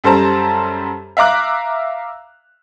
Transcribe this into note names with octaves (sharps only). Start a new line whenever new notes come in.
F#2 G3 A4 C5 A5 A#5
E5 F5 A#5 D6 F#6